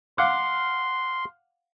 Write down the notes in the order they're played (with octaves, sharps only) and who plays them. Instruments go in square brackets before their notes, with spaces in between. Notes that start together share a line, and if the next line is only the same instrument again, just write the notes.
[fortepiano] F5 F#5 D6 [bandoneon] C6